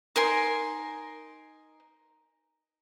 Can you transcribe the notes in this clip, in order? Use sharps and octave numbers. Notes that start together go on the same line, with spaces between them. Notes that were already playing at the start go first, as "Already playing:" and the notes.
D#4 A#4 G#5 C6